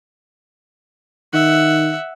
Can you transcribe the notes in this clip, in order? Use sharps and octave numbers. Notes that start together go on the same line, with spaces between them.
D#3 E5 F#5